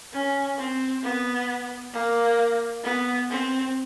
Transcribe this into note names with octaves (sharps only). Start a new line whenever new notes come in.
C#4
C4
B3
A#3
B3
C4